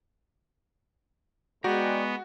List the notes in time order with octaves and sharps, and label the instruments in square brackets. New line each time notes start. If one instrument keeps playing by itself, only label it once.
[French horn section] G#3 [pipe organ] B3 [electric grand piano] F#4 [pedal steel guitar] D5 G5 A#5